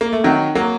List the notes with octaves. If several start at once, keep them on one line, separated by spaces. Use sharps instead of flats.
A#3
A3
D#3 F#3 C4
F#3 A#3